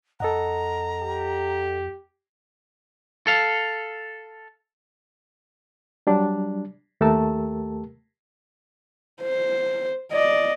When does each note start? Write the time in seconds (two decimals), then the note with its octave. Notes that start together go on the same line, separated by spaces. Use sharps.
0.20 F2 A4 D#5 F#5 A#5
1.02 G4
3.27 A4 F5
6.07 F#3 G3 D4
7.01 D#2 A3 G4 A#4 A5 E6
9.22 C5
10.12 D5 D#5